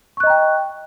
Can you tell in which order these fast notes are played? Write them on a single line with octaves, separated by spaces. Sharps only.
C#6 F#6 D#5 A#5 G5